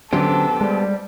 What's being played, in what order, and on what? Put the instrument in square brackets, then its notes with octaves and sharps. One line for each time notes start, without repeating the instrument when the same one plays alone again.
[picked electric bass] D3 F#3 C#4 [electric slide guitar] B3 G4 C5 [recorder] D4 [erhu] A4
[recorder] G3 [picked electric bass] G#3